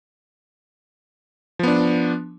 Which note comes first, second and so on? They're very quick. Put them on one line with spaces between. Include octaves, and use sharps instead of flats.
F3 B3 D4